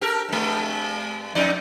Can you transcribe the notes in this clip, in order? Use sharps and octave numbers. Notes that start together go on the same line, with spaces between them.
G4 A4 A#4
G2 G#3
F2 D#4 D5